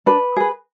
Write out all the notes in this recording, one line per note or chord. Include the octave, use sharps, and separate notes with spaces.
D4 B4
G#4 B4